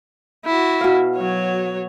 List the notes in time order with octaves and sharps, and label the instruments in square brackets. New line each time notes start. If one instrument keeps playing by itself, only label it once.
[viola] E4 F#4
[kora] B2 F5
[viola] F#3 C#5